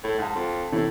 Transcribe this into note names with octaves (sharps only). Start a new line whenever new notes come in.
A2
G#2 F#5 A5
F2
A2 C3 E3 E4